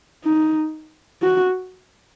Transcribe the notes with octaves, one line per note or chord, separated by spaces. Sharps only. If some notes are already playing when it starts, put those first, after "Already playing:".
D#4
F#4